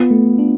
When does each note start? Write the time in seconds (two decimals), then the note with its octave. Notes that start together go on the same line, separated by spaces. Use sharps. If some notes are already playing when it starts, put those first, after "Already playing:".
Already playing: B3 F4
0.11 A3
0.39 D4